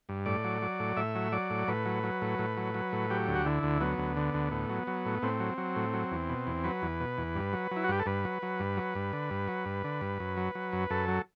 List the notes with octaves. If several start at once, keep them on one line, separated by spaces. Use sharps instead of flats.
G2
A2 D5
F#3
F#3
A2
A2 E5
F#3
F#3 D5
A2
A2 B4
F#3
F#3
A2
A2
F#3
F#3
A2
F#3 G4
D2
F#4
D3 E4
D2
F#3 B3
D2
D3
D2
A2
F#3
F#3
A2
A2 C4
F#3
F#3
A2
F#3
E2
B2
E2
F#3 B4
E2
B2
E2
G2
F#3
F#3
E4
F#4
G2 G4
A4
G2 B4
F#3
F#3
G2
F#3
G2
D3
G2
F#3
G2
D3
G2
F#2
F#3
F#3
F#2
F#2 A4
F#3